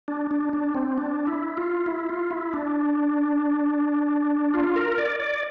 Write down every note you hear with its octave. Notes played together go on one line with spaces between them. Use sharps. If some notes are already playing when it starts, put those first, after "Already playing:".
D4
D4
D4
C4
D4
E4
F4
E4
F4
E4
D4
F4
A#4
D5
D5